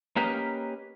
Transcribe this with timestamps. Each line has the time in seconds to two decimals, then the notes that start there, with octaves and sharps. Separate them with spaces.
0.16 A#3 C#4 G4 A#4 B4 D#5